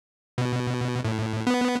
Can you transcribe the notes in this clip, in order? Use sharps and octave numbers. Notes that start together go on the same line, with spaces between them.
B2
A2
B3